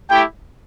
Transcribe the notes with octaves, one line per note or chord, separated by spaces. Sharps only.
A3 E4 G4 G5